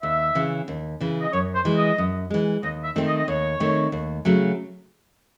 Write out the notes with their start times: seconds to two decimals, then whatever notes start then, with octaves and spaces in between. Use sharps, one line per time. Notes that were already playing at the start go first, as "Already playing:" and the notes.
0.02 D#2 E5
0.35 C#3 E3
0.68 D#2
1.00 C#3 E3
1.21 D#5
1.32 F#2 C#5
1.54 C5
1.65 E3 G#3
1.76 D#5
1.98 F#2
2.30 E3 G#3
2.63 D#2 D#5
2.84 E5
2.96 D#3 A3 C4
3.07 D#5
3.18 D#5
3.28 D#2 C#5
3.60 D#3 A3 C4
3.92 D#2
4.25 C#3 F#3 A3